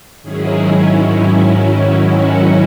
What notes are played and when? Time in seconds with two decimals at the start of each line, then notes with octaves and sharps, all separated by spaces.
0.22 G#2 D#3 F#3 C#4 E4 G#4
2.01 F#4